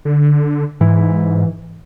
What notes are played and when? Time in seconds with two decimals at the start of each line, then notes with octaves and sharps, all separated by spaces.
0.05 D3
0.81 G#2 E3